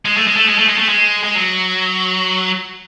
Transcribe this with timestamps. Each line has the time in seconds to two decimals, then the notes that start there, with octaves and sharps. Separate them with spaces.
0.05 G#3
0.17 A3
0.27 G#3
0.37 A3
0.48 G#3
0.58 A3
0.68 G#3
0.78 A3
0.89 G#3
1.24 G#3
1.35 F#3